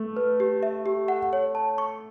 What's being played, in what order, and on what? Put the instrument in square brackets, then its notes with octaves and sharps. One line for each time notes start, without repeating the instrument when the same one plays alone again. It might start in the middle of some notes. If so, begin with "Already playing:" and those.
Already playing: [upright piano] A3
[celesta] B4
G4
E5
G4
F#5
C#5
A5
C#6